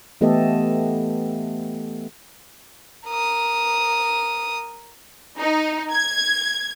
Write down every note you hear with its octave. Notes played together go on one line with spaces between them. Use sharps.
E3 A3 B3 G4 A4 D#5
A#4 D#6
D#4
G#6